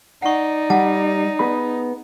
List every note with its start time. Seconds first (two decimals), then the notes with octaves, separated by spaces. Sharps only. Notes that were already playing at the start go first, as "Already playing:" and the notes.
0.22 D#4 D5 F#5 C#6
0.70 G3 F#5 A5
1.39 B3 G#4 B5